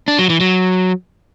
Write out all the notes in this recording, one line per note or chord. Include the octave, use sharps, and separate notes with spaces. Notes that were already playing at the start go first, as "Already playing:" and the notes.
D4
F#3
E3
F#3